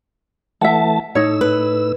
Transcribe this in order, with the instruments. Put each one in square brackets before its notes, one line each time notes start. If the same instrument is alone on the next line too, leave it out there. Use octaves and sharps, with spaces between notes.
[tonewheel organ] E3 A3 A5 [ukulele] E5 F#5
[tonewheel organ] A2 E6 [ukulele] D#4 C#5
[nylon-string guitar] B4